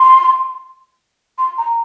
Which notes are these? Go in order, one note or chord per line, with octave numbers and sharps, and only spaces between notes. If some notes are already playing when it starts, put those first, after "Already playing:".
Already playing: C6
C6
A#5